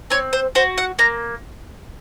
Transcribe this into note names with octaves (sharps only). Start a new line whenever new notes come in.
C4 C#5
C5
F#4 C5
F#5
A#3 A#5